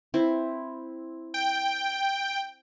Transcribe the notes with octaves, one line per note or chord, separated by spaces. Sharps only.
C4 E4
G5